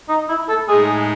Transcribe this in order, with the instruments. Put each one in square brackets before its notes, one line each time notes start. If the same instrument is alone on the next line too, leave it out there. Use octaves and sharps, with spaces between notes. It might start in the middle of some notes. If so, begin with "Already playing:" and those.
[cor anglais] D#4
E4
A4
[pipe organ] A2 G#3 D#4 [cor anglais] G#4